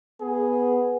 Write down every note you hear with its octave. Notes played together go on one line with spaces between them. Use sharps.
B3 G#4